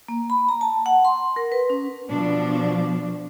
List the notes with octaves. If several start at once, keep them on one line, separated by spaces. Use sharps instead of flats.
A#3
B5
A#5
A5
F#5
C6
A#4
B4
C#4
B2 F3 D4